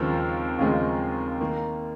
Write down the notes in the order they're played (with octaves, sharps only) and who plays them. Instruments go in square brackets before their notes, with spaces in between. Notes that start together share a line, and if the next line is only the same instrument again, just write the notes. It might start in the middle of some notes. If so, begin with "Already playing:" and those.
Already playing: [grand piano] D#2 C#3 F3 G#3 C4 A#4
D#2 C#3 F3 G#3 C4
D#3 A#3